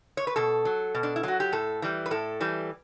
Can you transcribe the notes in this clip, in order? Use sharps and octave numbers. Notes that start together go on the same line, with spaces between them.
C#5
B4
B2 A4
F#3
B2
D4
E4
F#3 F#4
G4
A2 A4
E3 G3
B4
A2 A4
E3 G3